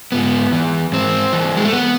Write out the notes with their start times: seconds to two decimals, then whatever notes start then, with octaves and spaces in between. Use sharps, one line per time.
0.12 G#2 B3
0.52 E3
0.92 G#2 C4
1.33 E3
1.57 G#3
1.65 A3
1.73 B3